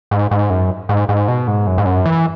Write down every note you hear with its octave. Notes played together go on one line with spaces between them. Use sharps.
G#2
G#2
F#2
G#2
G#2
B2
G#2
F#2
G#2
F#2
E3